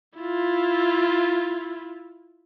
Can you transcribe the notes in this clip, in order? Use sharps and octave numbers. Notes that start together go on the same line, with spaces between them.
E4 F4